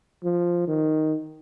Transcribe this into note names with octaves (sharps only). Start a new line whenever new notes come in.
F3
D#3